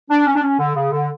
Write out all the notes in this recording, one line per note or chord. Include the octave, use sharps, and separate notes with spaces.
D4
C#4
D4
C#4
D3
C#3
D3